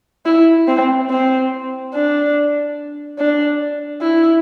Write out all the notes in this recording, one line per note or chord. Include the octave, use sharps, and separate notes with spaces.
E4
C4
C4
D4
D4
E4